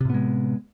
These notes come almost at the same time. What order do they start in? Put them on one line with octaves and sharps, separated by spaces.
C3 A2 B3 G#3